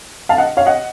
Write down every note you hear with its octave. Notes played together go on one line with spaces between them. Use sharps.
F5 A5
D#5 F#5
C#5 F5
D#5 F#5